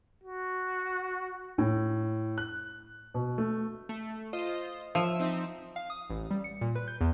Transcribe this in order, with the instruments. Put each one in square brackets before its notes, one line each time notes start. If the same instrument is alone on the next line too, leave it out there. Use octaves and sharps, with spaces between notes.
[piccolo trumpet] F#4
[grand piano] A2
F#6
B2
A3
[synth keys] A3
F4 C5 D#5
[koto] F3 [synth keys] E5
[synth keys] C4 D#4 E5
F5
D#6
A1
G3
C#7
A#2
B4
G6
E2